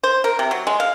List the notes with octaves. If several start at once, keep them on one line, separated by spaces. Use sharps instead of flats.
C5
A#4
C3
F#3
G#3
F5